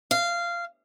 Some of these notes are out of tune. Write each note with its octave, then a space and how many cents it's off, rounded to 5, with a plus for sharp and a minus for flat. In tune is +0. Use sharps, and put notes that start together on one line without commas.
F5 -15